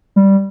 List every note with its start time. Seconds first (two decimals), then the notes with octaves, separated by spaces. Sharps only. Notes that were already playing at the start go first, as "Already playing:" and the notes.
0.16 G3